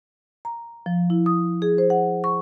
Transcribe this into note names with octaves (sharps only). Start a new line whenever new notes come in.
A#5
F3
E4
D#6
G#4
C5
F#5
C#6